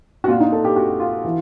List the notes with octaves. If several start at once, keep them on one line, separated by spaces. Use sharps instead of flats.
F#4
A#2 F4
D#4
A4
G4
F#4
F4
E3